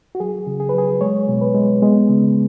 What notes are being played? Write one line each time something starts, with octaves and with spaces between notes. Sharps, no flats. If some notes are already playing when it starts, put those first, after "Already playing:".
F#4
F#3 G#4
C#3
G#4
B4
F#3 G#4
G#3 C#5
B2
B4
G#3
G#3 B3
C#3